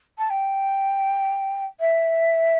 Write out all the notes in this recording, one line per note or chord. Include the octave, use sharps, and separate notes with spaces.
A5
G5
E5